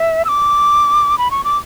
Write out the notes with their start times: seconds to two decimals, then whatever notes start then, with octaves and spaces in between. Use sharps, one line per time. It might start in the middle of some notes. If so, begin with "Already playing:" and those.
Already playing: E5
0.25 E6
0.28 D6
1.18 B5
1.31 C#6
1.44 D6